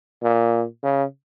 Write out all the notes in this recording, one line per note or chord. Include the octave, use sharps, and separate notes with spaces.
A#2
C#3